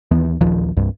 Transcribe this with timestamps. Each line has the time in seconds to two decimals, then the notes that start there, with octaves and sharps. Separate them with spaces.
0.11 D#2 E3 B3
0.40 D1 A#1 D#2 F3
0.77 C2 G2